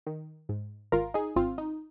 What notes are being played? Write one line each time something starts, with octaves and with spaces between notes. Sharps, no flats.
D#3
G#2
G#1 F4 A#4
D#4 G#4
G#1 C4 F4
D#4